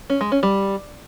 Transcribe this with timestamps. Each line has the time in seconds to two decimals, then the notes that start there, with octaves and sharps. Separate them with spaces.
0.10 C#4
0.21 G#3
0.32 C#4
0.43 G3